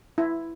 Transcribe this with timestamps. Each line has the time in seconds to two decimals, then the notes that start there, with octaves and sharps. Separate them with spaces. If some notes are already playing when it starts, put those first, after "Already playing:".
0.18 E4